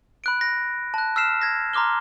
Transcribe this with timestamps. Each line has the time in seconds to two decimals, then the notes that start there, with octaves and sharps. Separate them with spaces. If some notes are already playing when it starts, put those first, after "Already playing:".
0.24 B5 F#6 D7
0.41 A#6
0.94 A5 F#6
1.16 E6 F6 B6 C7 E7
1.42 G#6 A#6
1.73 A#5 C6 D6 F6 G7